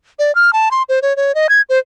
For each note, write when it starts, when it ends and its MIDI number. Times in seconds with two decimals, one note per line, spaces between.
0.19 0.34 74
0.35 0.53 89
0.53 0.69 81
0.71 0.83 84
0.89 0.99 72
1.02 1.16 73
1.16 1.35 73
1.35 1.47 75
1.49 1.61 92
1.69 1.79 72